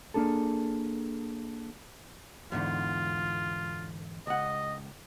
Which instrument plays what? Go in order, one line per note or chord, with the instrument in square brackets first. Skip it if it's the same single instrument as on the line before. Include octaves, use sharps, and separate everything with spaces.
[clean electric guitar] A#3 D4 G#4 A4
[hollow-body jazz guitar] E2 G#2 D3 [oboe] F4
[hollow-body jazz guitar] C#2 F#5 [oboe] D#5